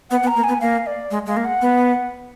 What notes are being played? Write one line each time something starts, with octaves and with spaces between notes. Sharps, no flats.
B3 F#5
B3
A#5
A#3
B3 G#5
A#3 F5
D5
G#3
G#3 F5
A#3
F#5
B3